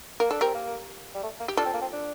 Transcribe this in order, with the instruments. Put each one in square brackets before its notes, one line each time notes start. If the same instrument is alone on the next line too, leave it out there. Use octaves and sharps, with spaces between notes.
[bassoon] A#3 [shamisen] A#4
[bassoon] D4 [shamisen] A4
[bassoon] C4 [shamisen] G4 A#4
[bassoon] A#3
G3
A3
A#3
[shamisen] G4
[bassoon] D4 [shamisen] F4 A4
[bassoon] C4
A#3
C4
D4